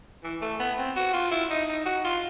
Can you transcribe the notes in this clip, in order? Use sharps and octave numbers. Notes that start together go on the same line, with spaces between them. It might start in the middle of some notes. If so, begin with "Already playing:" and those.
E3
A3
B3
C4
F#4
F4
E4
D#4
D#4
F#4
F4